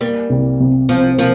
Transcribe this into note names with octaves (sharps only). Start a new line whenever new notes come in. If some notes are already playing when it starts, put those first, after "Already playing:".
G3 A#3
C2
C3
C3 F3
F3 A#3